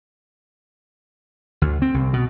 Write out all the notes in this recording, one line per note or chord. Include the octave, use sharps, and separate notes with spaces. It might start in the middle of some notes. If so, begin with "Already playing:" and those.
D2
C4
C2
B2